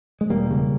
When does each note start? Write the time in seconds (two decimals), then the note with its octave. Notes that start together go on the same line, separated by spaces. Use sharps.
0.21 G#3
0.30 E1 G3 A#3
0.51 C#3